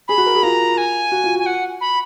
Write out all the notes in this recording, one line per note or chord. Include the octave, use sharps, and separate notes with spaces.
G#4 B5
F#4
A#4
G#4
F4 A#5
G#5
F#4
F4
F#4 G#5
F#5
B5